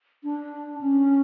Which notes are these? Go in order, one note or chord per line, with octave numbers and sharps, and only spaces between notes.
D4
C#4